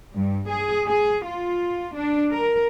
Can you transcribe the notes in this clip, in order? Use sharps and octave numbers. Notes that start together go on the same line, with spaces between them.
G2
G#4
G#4
F4
D4
A#4